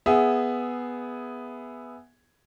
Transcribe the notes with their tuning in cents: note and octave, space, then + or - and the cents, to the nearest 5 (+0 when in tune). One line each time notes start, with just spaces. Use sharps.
B3 +0 G#4 +0 E5 +0